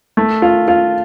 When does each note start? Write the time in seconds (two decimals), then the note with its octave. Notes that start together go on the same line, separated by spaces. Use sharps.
0.17 A3
0.42 F4
0.68 F4